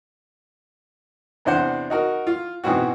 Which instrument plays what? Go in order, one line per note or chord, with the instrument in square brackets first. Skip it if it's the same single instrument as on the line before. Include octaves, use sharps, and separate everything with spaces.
[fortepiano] E2 C3 D4 C5 F#5
D#4 F#4 A#4
F4
G#2 B2 E3 C4 F#4